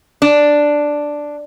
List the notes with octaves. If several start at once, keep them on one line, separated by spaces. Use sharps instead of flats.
D4